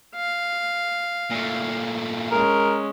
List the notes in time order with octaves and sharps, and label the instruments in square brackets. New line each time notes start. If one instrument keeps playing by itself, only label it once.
[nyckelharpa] F5
[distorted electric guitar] A#2 A3
[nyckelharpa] G#3 C#4 [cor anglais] A#4